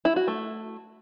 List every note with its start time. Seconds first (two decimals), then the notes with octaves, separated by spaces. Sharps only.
0.05 E4
0.16 F#4
0.28 A3